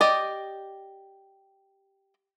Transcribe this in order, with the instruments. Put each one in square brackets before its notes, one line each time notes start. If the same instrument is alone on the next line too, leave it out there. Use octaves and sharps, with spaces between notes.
[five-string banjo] G4 D5 D#5